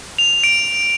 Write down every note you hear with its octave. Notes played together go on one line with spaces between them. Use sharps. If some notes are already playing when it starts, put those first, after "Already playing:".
F7
D7